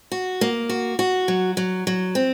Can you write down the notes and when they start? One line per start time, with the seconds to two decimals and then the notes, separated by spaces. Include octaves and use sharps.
0.12 F#4
0.41 A#3
0.69 F#4
0.99 F#4
1.28 F#3
1.57 F#3
1.87 F#3
2.15 C4